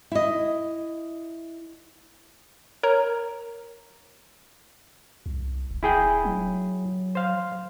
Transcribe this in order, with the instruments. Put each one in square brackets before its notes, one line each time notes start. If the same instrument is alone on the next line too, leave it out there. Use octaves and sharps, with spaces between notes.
[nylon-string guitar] E4 D#5
[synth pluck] A#4 C#5 A#5
[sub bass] C2
D#1
[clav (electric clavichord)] E4 G#4 G5
[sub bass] F#3
[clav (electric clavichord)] C5 F5